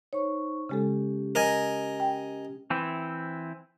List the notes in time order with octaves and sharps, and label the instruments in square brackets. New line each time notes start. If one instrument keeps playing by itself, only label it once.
[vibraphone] D#4 C5 C#6 [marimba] C#5
[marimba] C#3 G#3 A4 [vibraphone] C#4 G4
[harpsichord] A#4 D#5 G#5
[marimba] G5
[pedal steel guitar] E3 C4 E4